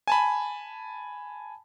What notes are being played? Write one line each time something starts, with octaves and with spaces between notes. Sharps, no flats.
G#5 A5 B5